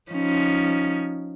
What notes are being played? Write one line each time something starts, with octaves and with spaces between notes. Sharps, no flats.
F3 C#4 D#4